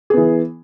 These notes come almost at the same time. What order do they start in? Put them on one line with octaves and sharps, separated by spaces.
G#4 B3 E3